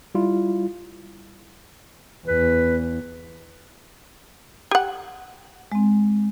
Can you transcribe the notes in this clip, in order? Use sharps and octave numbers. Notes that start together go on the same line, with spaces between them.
G3 E4 F4
E2 B4
G4 F#5
G#3 C4